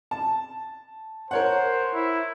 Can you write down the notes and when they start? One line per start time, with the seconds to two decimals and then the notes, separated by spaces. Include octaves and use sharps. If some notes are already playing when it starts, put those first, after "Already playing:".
0.11 A5
1.31 A#4 C5 C#5 F#5
1.94 E4